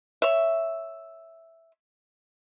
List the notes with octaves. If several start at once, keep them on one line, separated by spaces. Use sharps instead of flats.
C#5 E5